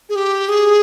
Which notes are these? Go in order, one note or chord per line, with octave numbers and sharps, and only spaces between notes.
G#4
G4
G#4